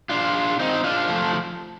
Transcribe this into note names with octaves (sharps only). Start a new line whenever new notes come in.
D4 F4
C4 D#4
D4 F4
F3 A3